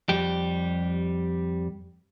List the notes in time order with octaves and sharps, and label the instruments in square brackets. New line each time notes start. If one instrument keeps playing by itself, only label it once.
[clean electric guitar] F2 G3 G4